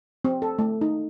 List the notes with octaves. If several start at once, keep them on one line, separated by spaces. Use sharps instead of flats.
C4
A4
A3
D#4